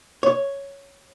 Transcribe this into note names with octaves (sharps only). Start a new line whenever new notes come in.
C#5